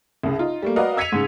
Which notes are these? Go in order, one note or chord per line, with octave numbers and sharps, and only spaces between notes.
C2 C#3
D#4 F4
G3 A3 A#3
F#4 A#4 B4 D5 D#5 F5
E6 G#6 B6 C#7 D#7 F7
G#2 C#3